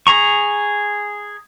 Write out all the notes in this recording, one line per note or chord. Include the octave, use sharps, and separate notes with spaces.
G#4 A#5 C#6